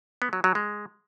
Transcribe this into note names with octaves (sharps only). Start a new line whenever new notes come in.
B3
F#3
F#3
G#3